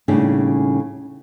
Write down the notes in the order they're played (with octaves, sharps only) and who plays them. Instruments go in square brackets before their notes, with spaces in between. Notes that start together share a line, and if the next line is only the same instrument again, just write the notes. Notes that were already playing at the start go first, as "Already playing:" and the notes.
[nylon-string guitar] D#2 A2 C#3 G3 C#4 D4